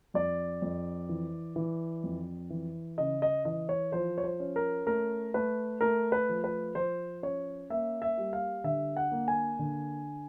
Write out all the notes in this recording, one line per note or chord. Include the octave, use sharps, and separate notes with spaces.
F2 D5
F2
E3
E3
F2
E3
C#3 D#5
D#5
E3 D#5
C#5
F3 C5
C#5
C5
C#4
A#4
A3 A#4
A3 B4
A3 A#4
B4
F3
B4
F3 C5
C#4 C#5
A#3 E5
E5
G3
F5
D3 E5
F#5
A#3
G#5
D3